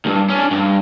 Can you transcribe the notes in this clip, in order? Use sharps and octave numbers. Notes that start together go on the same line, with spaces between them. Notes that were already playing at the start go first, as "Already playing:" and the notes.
D2 G2
C#4 D4
G2